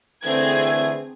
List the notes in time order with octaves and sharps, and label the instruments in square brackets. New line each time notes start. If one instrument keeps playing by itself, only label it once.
[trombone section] D3 E3 A3 [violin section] C4 G#4 G#6